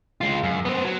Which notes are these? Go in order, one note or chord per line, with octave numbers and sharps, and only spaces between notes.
G#3 F4
F#2
B3 C5
F#3